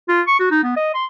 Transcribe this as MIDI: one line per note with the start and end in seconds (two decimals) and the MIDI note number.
0.09 0.22 65
0.27 0.39 85
0.40 0.48 66
0.51 0.61 63
0.63 0.72 59
0.76 0.91 75
0.94 1.05 84